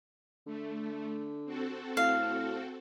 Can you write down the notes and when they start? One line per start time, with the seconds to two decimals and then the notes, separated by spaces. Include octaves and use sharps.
0.46 D3 A3
1.45 C4 F#4 A4
1.97 A2 F5